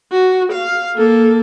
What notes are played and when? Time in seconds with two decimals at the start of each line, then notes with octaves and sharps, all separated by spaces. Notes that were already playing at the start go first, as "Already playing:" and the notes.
0.12 F#4
0.52 F5
0.96 A#3 A4